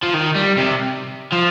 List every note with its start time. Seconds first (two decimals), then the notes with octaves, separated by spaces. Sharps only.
0.03 F3
0.14 D#3
0.36 G3
0.58 C3
1.32 F3